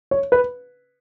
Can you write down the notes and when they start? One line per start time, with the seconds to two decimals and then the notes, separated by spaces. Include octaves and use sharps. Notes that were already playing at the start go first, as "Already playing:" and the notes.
0.11 C#5
0.32 B4